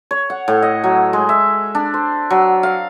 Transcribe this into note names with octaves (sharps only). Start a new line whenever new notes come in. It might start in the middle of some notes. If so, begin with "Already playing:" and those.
C#5
F#5
A2
D#5
F#3
G#3
E5
D4
C5
F#3
F5